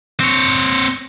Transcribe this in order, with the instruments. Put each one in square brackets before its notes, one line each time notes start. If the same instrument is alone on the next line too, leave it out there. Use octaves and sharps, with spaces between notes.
[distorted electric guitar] C4 C#5